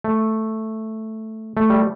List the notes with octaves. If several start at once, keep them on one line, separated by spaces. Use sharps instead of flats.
A3
A3
G3